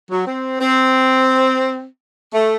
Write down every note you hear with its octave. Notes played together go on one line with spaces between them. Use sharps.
F#3
C4
C4
A3